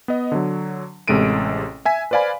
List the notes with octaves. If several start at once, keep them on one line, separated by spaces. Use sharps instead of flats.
B3 D#5
D3 F#3
A1 C3 G#3 A4 D7 D#7
E5 G#5 B6
B4 C5 D5 F5 G#5 B5